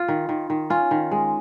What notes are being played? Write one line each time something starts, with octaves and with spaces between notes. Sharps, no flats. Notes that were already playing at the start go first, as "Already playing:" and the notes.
Already playing: F4
D#3
D#3
D#3
C#4 F4
D#3
G#3